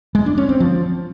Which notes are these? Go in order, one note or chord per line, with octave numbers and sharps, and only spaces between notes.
G#3
D4
C#4
C4
F3